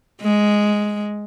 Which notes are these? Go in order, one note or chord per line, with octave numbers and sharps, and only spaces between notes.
G#3